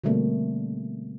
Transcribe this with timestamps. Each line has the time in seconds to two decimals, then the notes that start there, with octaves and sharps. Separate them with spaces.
0.04 B2 D3 G3 A3 A#3 C4